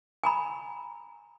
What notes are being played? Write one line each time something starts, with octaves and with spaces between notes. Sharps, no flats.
G#5 A#5 B5